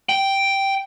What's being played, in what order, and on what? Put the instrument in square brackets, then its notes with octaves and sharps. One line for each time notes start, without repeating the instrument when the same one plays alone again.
[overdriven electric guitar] G5